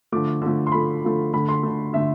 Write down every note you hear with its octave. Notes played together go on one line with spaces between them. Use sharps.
D3 F3 A3 D6
D3 F3 A3
C6
D3 F3 A3 B5
D3 F3 A3
D3 A3 B5
C6
D3 A3
D3 A3 E5